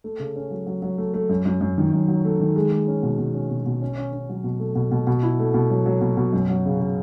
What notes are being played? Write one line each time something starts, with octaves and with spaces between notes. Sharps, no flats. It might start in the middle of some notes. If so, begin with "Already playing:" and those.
A3
C#3
C#4
F#3
F#3
F#3
A3
A3
F#2
F#2
F#2
D#3
F#2
F#3
A3
D#3
G#3
G#3
C#4
B2
B2
C#4
B2
B2
C#4
C#4
C#4
F#3
B2
A3
B2
B2
B2
E4
A3
B2
F#3
F#3
B2
B2
F#2
F#3
C#3
C#3